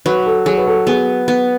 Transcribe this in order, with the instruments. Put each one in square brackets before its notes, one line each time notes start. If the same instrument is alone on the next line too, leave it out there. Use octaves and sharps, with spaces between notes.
[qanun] F#3 [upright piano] B4
[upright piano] A4
[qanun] F#3 [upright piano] G#4
[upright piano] B4
A4
[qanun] B3 [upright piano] G#4
[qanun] B3